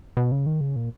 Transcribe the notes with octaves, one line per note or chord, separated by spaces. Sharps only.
B2
C#3
D#3
C#3
A#2